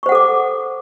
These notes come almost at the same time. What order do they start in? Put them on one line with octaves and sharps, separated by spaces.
C#6 C5 F#5 A4 D6